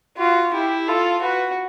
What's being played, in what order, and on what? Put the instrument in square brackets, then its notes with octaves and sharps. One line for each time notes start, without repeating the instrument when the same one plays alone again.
[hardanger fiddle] F4 [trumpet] F#4
[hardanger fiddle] E4 [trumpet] G4
[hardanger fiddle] F4 [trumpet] A4
[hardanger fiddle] F#4 [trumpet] B4